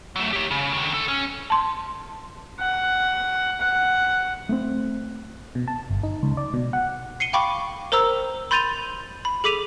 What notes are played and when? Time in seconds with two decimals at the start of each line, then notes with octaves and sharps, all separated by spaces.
0.16 F#3 A3
0.33 G4 C#5
0.51 C#3
0.74 D3 D#3
0.94 D2 A4
1.08 C#4
1.50 A5 C6
2.60 F#5
3.61 F#5
4.49 A3 B3 C4
5.55 B2
5.68 A5
5.90 G1
6.03 D#4
6.23 C#2
6.37 D5
6.54 B2
6.73 F#5
7.20 C7 C#7 D#7 G7
7.33 F5 G5 B5 C#6 D6
7.92 A#4 C5 A#5 E6
8.51 B5 C6 G6 A6 D#7 F7
9.25 B5
9.44 G#4 A4 D6 B6 D#7 F7